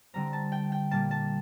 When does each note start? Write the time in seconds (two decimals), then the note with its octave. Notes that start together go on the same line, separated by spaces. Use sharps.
0.14 D3 G3 C4 A#5
0.33 A5
0.52 G5
0.72 G5
0.91 A#2 G3 A#3 A5
1.11 A5